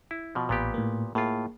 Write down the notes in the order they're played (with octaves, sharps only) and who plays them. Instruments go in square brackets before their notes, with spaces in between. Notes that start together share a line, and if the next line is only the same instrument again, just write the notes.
[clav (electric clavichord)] E4
B2 F3
[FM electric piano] A1 B5 [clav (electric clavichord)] A#2 B3 G4
[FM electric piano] A2 A#3
[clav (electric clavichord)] A2 F4 [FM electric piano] A#3 G#4